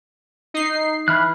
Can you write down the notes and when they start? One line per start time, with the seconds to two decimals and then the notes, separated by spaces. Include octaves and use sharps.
0.54 D#4 C7
1.08 E3 B5 F6 F#6